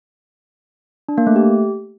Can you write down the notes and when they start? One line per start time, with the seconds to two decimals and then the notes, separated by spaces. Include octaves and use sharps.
1.09 D4
1.18 A#3
1.27 A3
1.36 G4